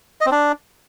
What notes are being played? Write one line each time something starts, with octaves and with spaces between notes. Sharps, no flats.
D#5
C4
D4